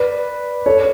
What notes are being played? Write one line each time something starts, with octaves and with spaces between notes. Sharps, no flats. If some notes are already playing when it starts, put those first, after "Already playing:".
Already playing: B4 D5
A4 C#5